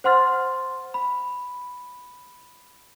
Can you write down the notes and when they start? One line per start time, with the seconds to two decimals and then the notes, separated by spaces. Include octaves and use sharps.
0.04 C5 F#5 C6 F6 A6
0.94 B5